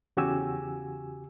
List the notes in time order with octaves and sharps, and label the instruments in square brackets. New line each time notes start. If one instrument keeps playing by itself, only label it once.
[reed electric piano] E2 C#3 F#4 G4 G#5 E6